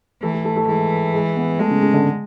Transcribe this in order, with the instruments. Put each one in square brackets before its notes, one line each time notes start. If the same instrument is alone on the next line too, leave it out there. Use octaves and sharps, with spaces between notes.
[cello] E3 [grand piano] A3
[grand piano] A3
A3
A3
[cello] E3 [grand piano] G#3
[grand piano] G#3
B3
[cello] G#3 [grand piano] A3
[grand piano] C#3
C#3
D3